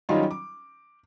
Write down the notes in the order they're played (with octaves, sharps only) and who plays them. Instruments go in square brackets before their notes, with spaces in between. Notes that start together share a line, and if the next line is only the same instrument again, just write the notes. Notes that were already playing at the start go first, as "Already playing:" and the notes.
[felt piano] D#3 F#3 G3 C#4 D#4 F4
D6